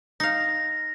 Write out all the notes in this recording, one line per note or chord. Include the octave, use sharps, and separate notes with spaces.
D#4 F5 A#6